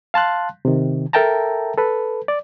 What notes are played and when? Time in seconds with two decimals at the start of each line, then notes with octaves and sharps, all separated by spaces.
0.14 F5 A5 C6 F#6
0.65 C3 D#3
1.13 A4 A#4 E5 G5 A5 A#5
1.78 A4 B4
2.28 D5